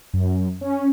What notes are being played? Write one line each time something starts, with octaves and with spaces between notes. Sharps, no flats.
F#2
C#4